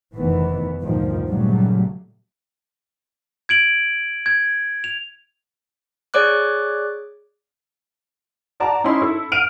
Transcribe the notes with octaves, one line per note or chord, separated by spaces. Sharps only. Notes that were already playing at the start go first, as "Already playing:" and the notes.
F1 D#3 E3 B3
D2 G2 A#2 D3 D#3 F3
A#2 C#3 F#3 G3 A3
G#6 D7 F#7
G#6
F7
G#4 C#5 D5 D6 F#6
F#4 D5 A5 A#5
C#4 D#4 E4 B5 C6
E4 A4
F6 D7 D#7 F7